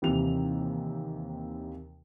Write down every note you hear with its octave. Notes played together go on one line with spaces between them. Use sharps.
D#2 C3 E3 F7